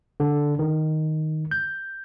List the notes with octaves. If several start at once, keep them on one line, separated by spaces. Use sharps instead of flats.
D3
D#3
G6